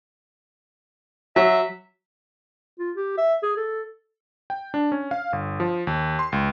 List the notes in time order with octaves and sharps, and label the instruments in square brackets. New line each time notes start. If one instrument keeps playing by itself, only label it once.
[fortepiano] F#3 [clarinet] E5
[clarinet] F4
G4
E5
G#4
A4
[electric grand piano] G5
D4
C#4
F5
G1
F3
D#2
C6
C#2